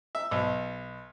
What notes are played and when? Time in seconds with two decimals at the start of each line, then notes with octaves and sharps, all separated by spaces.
0.15 E5
0.31 B1